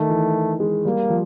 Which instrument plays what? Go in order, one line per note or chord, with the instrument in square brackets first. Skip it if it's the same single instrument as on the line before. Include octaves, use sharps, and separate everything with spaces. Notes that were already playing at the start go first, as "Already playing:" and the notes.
Already playing: [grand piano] D#3 [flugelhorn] A3
[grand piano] E3
G#3
[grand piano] G3 [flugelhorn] A#3
[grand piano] F3